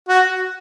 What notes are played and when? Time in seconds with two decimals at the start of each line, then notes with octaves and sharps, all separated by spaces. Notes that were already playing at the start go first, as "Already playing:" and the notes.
0.09 F#4